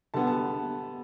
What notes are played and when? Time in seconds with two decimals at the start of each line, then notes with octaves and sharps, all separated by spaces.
0.14 D3 G3 B3 A5
0.27 A5